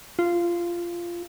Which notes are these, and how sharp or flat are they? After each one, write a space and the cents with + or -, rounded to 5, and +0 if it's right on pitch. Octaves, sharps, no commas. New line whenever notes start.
F4 -15